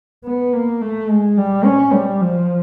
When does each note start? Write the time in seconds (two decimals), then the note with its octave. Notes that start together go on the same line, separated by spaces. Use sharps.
0.25 B3
0.53 A#3
0.81 A3
1.10 G#3
1.38 G3
1.65 C#4
1.94 G3
2.22 F3